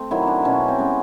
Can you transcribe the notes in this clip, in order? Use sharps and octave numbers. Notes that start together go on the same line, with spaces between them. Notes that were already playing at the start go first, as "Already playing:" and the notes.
Already playing: A3 C4
D#3 F#3 E4
D4
B2 C#4
C4
G#3 B3 C#4